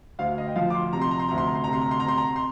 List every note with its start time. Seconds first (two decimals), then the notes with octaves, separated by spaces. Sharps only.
0.19 D2 F5
0.38 D#5
0.48 G5
0.56 F3 F5
0.70 D6
0.75 C6
0.93 C3 A#5
1.02 C6
1.11 A#5
1.20 C6
1.28 D2 A#5
1.38 C6
1.47 A#5
1.55 C6
1.64 C3 A#5
1.73 C6
1.81 A#5
1.91 C6
2.00 A#5
2.05 C3 C6
2.17 A#5
2.36 C6